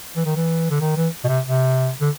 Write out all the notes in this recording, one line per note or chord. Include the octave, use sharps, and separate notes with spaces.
E3
D#3
E3
D3
D#3
E3
B2
C3
C3
D3